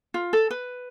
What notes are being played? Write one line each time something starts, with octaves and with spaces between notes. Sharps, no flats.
F4
A4
B4